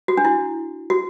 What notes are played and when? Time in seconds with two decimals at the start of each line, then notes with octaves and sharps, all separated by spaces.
0.08 F#4
0.17 D4
0.25 E4
0.90 F#4